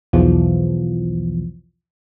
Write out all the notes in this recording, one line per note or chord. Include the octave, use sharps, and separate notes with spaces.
B1 E2 E3 F3